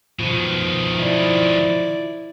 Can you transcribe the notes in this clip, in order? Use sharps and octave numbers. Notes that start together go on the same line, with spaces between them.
B2 D#3 F3
E4 D5